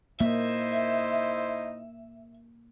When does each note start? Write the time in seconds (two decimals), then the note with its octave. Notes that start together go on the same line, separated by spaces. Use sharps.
0.21 A#3 D#4 E4 C5 E5